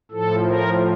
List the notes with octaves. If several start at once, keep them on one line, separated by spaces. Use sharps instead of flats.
A2 F3 A4
A#4